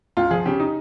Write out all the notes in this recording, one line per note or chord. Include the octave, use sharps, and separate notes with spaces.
C#2 F4
F3 G#4
C#3 G4
D#4